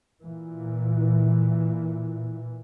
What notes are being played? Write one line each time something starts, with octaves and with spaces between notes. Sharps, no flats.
A#2 E3